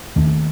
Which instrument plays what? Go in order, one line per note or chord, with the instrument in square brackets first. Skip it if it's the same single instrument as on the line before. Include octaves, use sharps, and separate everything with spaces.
[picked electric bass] D#2 D#3 A3 C#4